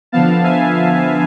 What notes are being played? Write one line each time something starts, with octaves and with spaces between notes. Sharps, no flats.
D3 F3 B3 F5 A5
E5 G#5